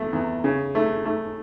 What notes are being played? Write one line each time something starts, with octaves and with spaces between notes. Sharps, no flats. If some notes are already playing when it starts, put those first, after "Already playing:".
Already playing: E2 A3
E2
C#3
A3
A3